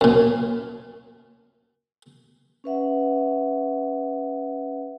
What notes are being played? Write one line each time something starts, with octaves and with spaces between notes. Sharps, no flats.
F#2 A#2
C#4 B4 E5 F#5